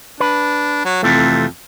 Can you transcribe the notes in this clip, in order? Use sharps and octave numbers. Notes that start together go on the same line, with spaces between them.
D4 B4
F#3
F2 C3 E3 A3